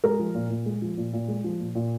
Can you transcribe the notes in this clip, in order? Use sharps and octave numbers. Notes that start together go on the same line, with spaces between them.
G#3 A#4
F3
A#2
A#2
G#3
F3
A#2
A#2
G#3
F3
A#2
A#2